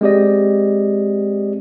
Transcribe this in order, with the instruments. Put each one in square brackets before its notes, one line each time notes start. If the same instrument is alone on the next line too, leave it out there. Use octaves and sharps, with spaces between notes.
[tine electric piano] G#3 C4 G4 D5 D#5